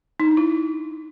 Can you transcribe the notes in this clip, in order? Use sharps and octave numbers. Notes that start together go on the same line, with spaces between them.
D#4
D4
D#4
E4